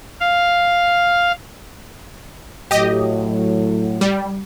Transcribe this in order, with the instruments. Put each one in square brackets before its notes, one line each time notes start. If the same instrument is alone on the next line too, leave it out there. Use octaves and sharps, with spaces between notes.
[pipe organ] F5
[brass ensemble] A2 F#3 [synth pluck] G4 D#5
[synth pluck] G3